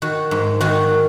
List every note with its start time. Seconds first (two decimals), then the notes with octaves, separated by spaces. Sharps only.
0.02 D#3 F#4
0.31 G#2
0.61 D#3 F#4